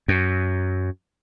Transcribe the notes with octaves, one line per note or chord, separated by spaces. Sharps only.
F#2